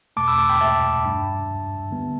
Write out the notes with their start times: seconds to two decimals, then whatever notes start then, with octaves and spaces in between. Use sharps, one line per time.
0.17 E2 B2 A3 A5 D6
0.28 B5 E6
0.38 A5 D6
0.49 G5 B5
0.61 E5 A5
1.04 G2 G3 D4
1.91 D3 G3 B3